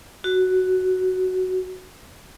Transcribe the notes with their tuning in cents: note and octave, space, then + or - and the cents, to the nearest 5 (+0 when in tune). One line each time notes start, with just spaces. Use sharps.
F#4 +5